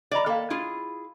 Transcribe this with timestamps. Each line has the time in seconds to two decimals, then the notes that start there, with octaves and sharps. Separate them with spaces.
0.12 D5 D#5 A#5 B5
0.26 A#3 A4 F5 G5
0.50 E4 F4 G#4